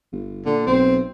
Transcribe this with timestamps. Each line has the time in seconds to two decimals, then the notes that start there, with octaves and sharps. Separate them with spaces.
0.12 G1
0.46 A#2 D3
0.67 B1 C4